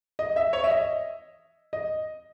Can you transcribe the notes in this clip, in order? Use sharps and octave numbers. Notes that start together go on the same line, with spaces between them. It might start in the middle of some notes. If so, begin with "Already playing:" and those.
D#5
E5
C#5
E5
D#5
D#5